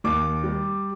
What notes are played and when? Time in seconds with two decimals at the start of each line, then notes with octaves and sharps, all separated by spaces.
0.04 D#2 D6
0.44 G3